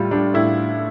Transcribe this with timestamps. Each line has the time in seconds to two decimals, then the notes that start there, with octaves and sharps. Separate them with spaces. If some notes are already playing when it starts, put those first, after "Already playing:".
Already playing: A2 G3 F4
0.11 G3 D4
0.34 A2 E4